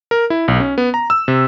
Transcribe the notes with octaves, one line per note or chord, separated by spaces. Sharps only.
A#4
E4
B1
C#4
B3
A#5
E6
C3